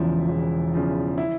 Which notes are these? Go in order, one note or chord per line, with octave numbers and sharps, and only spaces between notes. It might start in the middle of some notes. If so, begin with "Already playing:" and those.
Already playing: E1 E2 C#3 F3 E4
E1
E2 C#3 F3
E4